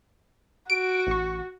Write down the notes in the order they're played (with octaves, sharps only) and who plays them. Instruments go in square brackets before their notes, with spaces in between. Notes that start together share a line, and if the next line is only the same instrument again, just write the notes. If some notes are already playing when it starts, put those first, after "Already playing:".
[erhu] F#4 [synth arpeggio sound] D7
[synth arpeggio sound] A1 C#6